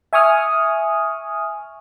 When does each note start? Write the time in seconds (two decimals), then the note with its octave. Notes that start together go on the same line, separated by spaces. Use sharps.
0.13 E5 G#5 C#6 D#6 F6